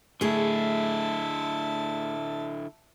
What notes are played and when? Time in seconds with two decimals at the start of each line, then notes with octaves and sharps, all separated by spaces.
0.21 D3 A3 E4 G#4 E5 A5